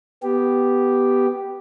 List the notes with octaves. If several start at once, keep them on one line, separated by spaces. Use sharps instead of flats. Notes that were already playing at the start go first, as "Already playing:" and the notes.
B3 G4